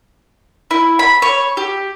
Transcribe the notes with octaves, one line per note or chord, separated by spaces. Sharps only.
E4
B5
C#5
G4